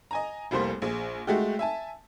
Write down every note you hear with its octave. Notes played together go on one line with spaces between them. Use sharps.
D#5 G#5 A#5
F1 C2 G3 A#3 C5 C6
A#1 G#4
G#3 A3 F#4 G4
E5 G#5 A5